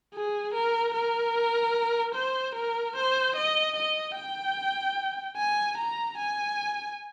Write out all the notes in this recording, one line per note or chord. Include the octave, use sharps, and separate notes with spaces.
G#4
A#4
A#4
C5
A#4
C5
D#5
D#5
G5
G#5
A#5
G#5